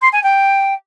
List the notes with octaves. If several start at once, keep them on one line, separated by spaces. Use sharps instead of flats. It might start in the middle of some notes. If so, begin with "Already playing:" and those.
C6
G#5
G5